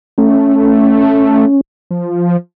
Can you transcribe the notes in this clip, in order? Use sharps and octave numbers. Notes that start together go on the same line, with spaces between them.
A3 C#4
F3